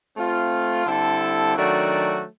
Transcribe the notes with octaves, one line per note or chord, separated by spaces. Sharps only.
A3 C4 F4
D3 G3 C4 E4 A4
D#3 F#3 A3 D4 F#4